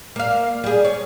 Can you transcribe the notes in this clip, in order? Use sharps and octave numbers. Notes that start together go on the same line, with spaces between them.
A#3 F5
G3 G#4
C#5